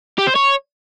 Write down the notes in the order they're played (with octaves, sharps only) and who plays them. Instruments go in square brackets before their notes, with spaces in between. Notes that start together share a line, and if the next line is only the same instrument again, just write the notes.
[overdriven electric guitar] G4
C5
C#5